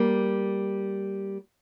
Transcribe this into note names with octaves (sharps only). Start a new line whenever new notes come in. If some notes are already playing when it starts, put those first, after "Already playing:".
Already playing: G3 A#3